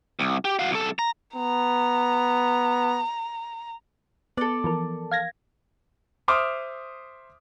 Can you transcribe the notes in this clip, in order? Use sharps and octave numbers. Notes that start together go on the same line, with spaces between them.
C2
G4
F#4 F5
C2 A4
A#5
B3 A#5
B3 A4 D5
E3 F3 A#4
F5 G#6 A#6
C5 E5 C6 D6 D#6 F6